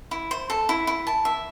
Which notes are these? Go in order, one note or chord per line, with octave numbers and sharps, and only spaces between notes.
E4
C5
A4
E4
E4
A5
E5